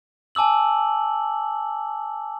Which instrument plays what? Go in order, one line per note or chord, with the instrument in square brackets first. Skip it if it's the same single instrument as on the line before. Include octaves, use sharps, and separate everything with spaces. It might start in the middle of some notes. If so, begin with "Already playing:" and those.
[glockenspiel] G#5 A5 D6 E6 F#7